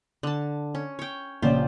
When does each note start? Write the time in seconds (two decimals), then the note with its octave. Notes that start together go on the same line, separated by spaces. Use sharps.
0.23 D3 A5
0.75 C#4
0.99 C#5 G5
1.42 A#1 C#3 F4 G4 C5 D5